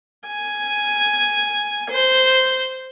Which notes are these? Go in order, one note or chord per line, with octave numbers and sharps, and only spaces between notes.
G#5
C5